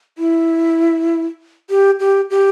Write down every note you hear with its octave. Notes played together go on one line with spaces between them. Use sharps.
E4
G4
G4
G4